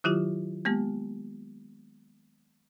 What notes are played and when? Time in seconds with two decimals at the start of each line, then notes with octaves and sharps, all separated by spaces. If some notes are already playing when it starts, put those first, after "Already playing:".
0.04 D#3 F#3 E4 F4 G4
0.65 G#3 A#3 B3 G4